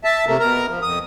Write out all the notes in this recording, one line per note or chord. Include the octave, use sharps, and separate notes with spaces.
E5 A5
C3 A3 A#3
B2 A#4 A#5
F3
F2 D#6